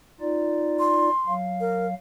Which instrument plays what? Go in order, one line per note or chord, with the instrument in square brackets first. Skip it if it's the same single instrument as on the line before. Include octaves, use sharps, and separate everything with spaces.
[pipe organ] D#4 F4 D5
[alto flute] C6
[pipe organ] F#3 F5
[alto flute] A#4